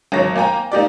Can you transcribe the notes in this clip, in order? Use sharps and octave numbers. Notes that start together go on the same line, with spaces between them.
G#1 F#3 C#5 A#6
A#3 G5 G#5 A#5
A#3 D#4 G4 D5